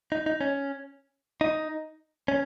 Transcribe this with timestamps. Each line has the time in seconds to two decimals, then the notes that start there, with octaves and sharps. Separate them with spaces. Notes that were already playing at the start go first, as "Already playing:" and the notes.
0.12 D#4
0.26 D#4
0.41 C#4
1.41 D#4
2.28 C#4